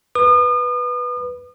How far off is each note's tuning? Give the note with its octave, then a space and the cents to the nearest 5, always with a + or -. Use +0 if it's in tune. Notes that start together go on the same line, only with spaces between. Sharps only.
B4 -5 D#6 -40